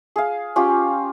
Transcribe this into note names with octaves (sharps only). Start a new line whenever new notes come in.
G#4 F5
C#4 F4 G4